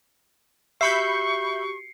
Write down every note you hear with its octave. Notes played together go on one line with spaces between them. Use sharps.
F#4 G4 E5 B5 C#6 G6 C7 C#7